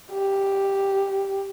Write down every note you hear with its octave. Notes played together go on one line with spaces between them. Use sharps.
G4